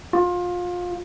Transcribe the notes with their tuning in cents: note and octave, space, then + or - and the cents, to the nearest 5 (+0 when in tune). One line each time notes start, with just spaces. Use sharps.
F4 +25